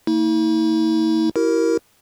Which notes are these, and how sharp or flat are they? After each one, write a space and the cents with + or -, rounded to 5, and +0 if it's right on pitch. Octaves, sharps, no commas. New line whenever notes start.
A#3 -40 E4 -45
E4 +0 G4 -45 A#4 +0